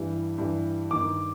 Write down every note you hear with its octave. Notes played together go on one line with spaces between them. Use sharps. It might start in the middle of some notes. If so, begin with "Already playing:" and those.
Already playing: G2 E3
G2 E3
G2 D#3 D6